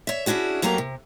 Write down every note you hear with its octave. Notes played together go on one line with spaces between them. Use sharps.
C#5 E5
C#4 D4 E4 F#4 G#4
F2 F#3 A3 A#3 G4 A#5
C3